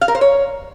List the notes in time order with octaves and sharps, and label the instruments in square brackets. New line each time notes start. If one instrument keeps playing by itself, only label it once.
[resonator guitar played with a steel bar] F5
A#4
C5
C#5